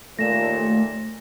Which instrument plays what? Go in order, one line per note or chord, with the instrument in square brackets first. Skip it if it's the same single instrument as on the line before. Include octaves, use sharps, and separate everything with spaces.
[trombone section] D#2 A#2 [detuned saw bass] A3 [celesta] A#6 E7